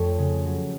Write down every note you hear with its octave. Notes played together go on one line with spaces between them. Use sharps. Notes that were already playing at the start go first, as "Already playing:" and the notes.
Already playing: F2 A3 C#5
C#3
F#3